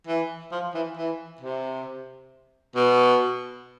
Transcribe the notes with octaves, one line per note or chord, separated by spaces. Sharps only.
E3
F3
E3
E3
C3
B2